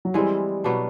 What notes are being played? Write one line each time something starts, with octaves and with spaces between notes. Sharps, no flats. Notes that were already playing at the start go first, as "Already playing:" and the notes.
F#3
E3 G3 G#3 C4
B2 F#3 B3 D4